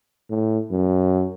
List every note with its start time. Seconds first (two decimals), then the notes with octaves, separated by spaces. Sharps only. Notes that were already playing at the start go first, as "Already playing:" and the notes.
0.30 A2
0.71 F#2